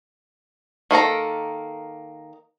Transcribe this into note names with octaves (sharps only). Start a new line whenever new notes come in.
D#3 A#3 A4 A#5